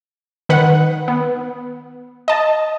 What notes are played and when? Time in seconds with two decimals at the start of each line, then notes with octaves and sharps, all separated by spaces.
0.49 D#3 B4 F#5
1.08 B3
2.28 D#5 A5